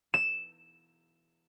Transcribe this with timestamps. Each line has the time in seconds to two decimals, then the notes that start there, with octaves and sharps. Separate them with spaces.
0.14 E7